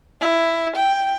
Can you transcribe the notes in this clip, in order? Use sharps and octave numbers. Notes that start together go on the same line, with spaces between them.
E4
G5